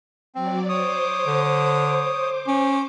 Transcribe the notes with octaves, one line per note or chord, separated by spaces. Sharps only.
F#3 C4 D5
C5 C#5 D6 D#6
D3
C#4